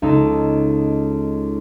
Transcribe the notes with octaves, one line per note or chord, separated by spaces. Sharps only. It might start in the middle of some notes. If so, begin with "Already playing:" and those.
C#2 D#4 A4